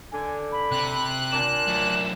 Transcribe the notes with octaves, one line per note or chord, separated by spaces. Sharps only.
D3 G#5
B5
C3 F#6
A#2 D4 E7
F#2 A3